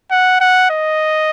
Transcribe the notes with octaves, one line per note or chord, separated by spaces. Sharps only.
F#5
F#5
D#5